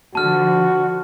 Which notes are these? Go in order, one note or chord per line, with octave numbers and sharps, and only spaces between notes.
D3 F3 F#4 A5 F6